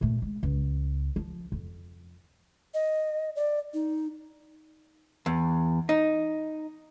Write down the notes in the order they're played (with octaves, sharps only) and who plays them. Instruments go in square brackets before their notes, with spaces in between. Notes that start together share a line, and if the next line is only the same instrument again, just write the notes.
[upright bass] A#2 A3
G#3
C#2
F3
F2
[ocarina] D#5
D5
D#4
[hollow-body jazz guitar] E2
D#4